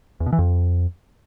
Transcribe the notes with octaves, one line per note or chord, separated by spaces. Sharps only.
E2
B2
E3
F2